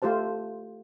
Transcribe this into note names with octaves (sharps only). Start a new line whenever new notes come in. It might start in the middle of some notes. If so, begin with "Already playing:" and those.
A3 F4 G4 C5 A5